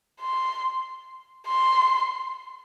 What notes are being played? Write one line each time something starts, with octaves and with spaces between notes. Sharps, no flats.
C6
C6